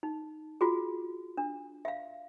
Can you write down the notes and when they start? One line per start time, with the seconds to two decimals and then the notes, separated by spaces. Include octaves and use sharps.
0.03 D#4
0.61 F4 F#4 G#4
1.38 D4
1.85 E5 F5